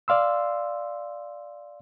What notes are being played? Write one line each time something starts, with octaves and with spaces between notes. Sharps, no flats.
D5 F5 C6 E6